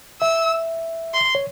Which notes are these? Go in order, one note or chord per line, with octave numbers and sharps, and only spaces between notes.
E5 E6
C6
C#5